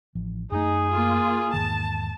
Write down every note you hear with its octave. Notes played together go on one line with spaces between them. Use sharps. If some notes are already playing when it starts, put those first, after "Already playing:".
A1 F3
F#2 A3 D#4 G#4
A#3 F4
E2 G#2 D#3 A5